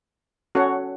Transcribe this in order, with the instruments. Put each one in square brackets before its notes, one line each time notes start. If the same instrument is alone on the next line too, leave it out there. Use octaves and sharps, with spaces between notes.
[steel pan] C#4 F#4 A4 C#5 F#5